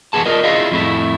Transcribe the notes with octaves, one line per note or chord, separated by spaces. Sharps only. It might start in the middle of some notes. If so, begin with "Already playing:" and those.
E2 A#2 B3 G#4 A5
F4 A#4 D5 D#5
E4 F4 G#4 D#5 F5
F2 A2 E4